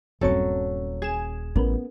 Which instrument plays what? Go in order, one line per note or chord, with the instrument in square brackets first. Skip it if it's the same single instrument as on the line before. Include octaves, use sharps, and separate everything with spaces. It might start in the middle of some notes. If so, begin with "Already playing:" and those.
[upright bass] D#1 C#4 [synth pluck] G2 C4 C#6 [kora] F#3 A4
[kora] G#4 [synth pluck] G#6 E7
[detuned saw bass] A1 [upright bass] B3 [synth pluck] C#4 A#4 B4